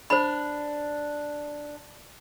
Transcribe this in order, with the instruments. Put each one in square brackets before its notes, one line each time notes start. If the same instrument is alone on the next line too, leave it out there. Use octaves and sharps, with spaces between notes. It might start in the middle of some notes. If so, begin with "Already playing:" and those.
[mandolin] D4 [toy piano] C5 B5